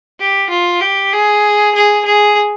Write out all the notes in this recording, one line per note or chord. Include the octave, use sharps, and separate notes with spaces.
G4
F4
G4
G#4
G#4
G#4